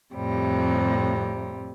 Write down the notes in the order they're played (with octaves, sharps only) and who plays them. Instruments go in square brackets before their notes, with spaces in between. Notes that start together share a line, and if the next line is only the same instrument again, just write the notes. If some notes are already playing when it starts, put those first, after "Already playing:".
[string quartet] F2 A2 C3 G3